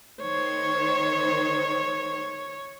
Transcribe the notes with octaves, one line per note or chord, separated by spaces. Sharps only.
D#3 C5 C#5